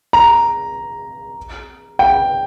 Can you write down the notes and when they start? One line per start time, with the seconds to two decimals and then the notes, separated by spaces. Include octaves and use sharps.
0.13 A#5
1.99 G5